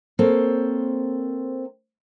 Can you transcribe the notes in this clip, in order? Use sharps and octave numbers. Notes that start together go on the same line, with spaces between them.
A#3 C4 A4 C5 C#5